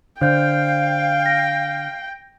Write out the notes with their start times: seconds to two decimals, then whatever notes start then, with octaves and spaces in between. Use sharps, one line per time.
0.21 D3 C5 F5 G5 G6
1.26 A#6